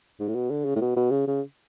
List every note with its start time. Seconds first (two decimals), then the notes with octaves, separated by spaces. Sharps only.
0.20 G#2
0.28 A2
0.35 B2
0.51 D3
0.65 C#3
0.76 A2
0.81 B2
0.96 B2
1.11 C#3
1.27 C#3